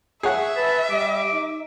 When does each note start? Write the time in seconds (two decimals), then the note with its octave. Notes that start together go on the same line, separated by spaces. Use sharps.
0.23 G#4 C#5 E5 F#5
0.57 B4 A5
0.90 G3 D6
1.33 D#4